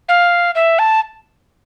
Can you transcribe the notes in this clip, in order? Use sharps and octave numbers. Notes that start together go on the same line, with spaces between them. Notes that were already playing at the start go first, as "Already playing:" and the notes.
F5
E5
A5